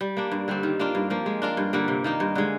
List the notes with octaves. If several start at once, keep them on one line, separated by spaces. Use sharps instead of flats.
G3
A#3 D4
G2
D3 G3 C4
D#3
A#3 D4 F4
G2
F3 A#3
G#3
D4 F4 A#4
G2
D3 G3 A#3
C3
D#3 A#3 D#4
G2
D3 G#3